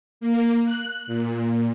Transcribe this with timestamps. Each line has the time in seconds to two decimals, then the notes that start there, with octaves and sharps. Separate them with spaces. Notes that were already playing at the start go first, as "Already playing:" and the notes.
0.21 A#3
0.65 F#6
1.07 A#2